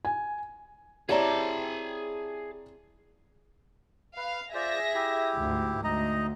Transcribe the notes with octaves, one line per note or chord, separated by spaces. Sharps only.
G#5
C4 E4 G4 G#4 C#5 D5 A5 A#5
B4 F5
F4 G#4 C5 D5 E5 A#6
E4 G4
D2 G#2
D2 D#4 D#5 A#5